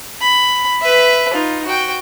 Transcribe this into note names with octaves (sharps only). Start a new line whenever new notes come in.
B5
B4 E5
D#4 F4
F#4 G5